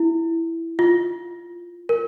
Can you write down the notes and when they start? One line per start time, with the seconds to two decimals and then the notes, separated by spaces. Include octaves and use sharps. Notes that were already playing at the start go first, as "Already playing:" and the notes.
Already playing: E4
0.79 F4
1.89 A#4